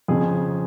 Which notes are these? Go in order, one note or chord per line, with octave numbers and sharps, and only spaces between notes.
F2 C#3 G#4